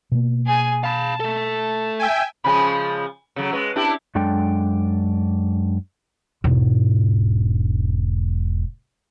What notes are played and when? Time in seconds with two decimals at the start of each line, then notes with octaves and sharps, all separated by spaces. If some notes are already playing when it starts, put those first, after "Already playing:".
0.12 B2 A#3
0.46 G#4 G#5
0.84 F5 A5 B5
1.20 A3 A4
1.99 E5 G5 G#5
2.44 C#3 F3 G#3 G#5 B5
3.36 C#3 F#3 A4
3.53 G#3 B4 A5
3.76 D4 E4 G4
4.15 F#2 G#3 D4 A4 G5
6.44 E1 G#2